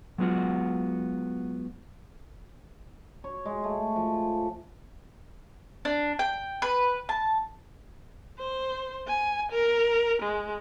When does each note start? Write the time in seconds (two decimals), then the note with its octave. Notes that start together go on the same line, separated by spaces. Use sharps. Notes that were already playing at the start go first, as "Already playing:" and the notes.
0.18 F#3 G#3 B3 F4 F#4
3.24 C#5
3.45 G#3
3.64 A3
3.96 F3
5.85 D4
6.19 G5
6.62 B4
7.09 A5
8.38 C5
9.08 G#5
9.52 A#4
10.22 G#3